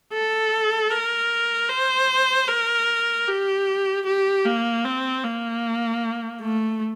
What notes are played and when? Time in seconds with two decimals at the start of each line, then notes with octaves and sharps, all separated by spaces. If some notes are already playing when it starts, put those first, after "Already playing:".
0.13 A4
0.91 A#4
1.70 C5
2.48 A#4
3.28 G4
4.06 G4
4.45 A#3
4.85 C4
5.24 A#3
6.41 A3